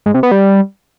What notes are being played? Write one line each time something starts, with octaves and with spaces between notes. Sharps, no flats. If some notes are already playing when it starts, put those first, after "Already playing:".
G#2
C3
B3
G3